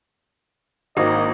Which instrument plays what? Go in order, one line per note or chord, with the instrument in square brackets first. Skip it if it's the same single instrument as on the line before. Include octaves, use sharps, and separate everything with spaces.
[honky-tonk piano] G#1 [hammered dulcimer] A#3 C4 D4 [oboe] D#5